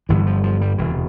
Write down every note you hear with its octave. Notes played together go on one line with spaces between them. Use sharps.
G1 G2 D3 E3
F3
F3
G3
E1 D2 C3 E3